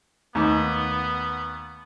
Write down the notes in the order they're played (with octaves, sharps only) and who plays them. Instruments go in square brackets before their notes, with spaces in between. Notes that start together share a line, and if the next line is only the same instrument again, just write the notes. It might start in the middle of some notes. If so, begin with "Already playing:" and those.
[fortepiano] D#2 [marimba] A3 D#4 D6 [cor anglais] B3